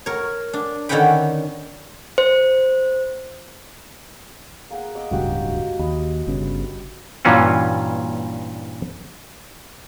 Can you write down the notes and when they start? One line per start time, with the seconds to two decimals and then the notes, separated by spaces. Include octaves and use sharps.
0.06 A#4 C#5
0.53 D4
0.89 D3 D#3 C#4 F#5 G5 B5
2.18 C5
4.71 A#3 G#4 F#5
4.95 D#5 D6 E6
5.11 D1 C#2 G2 A#3 F#4 G4
5.79 D#2 D#5 B5
6.27 G1 G2 C#3
7.25 G2 A#2 E3 C#4 F4 F#4